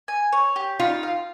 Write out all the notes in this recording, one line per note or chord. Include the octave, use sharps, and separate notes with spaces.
G#5
C#5
G4
D#4 F4
F5